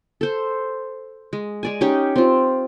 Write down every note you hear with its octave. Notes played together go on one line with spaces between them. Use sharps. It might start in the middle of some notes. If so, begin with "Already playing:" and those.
A4 C5
G#3
G#3 D5 G#5
C#4 D#4 G4 C#5
C4 F4